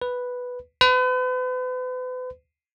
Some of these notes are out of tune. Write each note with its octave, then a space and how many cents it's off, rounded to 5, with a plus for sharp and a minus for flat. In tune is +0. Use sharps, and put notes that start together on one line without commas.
B4 +0
B4 +40